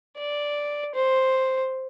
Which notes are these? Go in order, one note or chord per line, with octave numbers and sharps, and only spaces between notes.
D5
C5